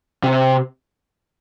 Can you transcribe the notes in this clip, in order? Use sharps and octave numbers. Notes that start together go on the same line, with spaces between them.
C3